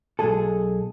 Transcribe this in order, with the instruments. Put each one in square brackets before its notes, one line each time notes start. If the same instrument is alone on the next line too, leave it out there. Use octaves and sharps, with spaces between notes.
[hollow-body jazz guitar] B1 G#3 G#4 A4